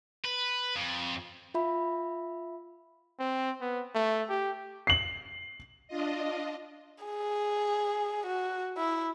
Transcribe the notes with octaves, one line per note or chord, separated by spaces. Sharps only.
B4
F2
F4 E5 B5
C4
B3
A3
G4
C7 F#7
D4 F4 D#5
G#4
F#4
E4